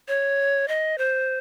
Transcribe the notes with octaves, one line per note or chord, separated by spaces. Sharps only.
C#5
D#5
C5